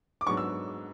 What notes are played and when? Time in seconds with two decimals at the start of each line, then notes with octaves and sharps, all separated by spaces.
0.21 D6
0.27 G#2 F#3 B3 D4 C#6
0.37 E6